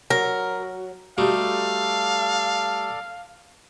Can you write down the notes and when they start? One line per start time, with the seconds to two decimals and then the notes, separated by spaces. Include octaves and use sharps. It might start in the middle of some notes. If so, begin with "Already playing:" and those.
0.10 F#3 A#4
1.18 G3 A3 D#4 F#4 G4 A4 D5 F5